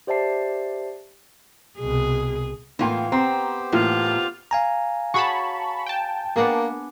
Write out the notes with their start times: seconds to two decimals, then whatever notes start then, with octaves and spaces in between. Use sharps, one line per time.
0.07 G4 C5 D5 E5 A5 C7
1.79 C2 B2 G#4
2.79 A2 E3 A#3 B3 F4 G5
3.12 B3 C4 G4 C5 A#5
3.73 A2 E3 A#3 F4
4.51 F5 G#5 A#5
5.14 F#4 G#4 C#5 A5 B5 C#6
5.86 G5 A5
6.36 A#3 B3 D4 G#4